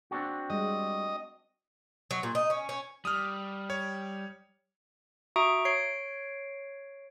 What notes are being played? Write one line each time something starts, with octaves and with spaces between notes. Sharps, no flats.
C4 D4 F#4
G3 G#3 D#5
F#3
A#2
D#4
C#4
C#4
G3 D#6 F6
C#5
F#4 E5 A#5 C#6 D#6 D7
C#5 C7 D7